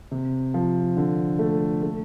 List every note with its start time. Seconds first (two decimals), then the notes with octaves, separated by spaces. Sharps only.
0.11 C3
0.54 F3
0.97 D3
1.39 A3
1.83 A3